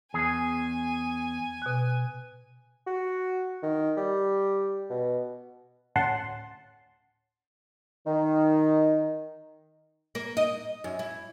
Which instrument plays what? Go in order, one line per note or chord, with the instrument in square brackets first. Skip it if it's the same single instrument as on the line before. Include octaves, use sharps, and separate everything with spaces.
[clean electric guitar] E2 G#4 [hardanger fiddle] G#5
[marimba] B2 F#6
[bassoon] F#4
D#3
G3
B2
[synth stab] D2 A2 C#4 F#5 A5 C6
[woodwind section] D#3
[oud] A#3
D#5
F#2
E4